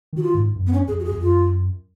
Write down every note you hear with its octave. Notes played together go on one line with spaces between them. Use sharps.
D#3 F#4
F4
G#2
F#2
B3
C#4
F2 G#4
F#4
G#4
F2
F#2 F4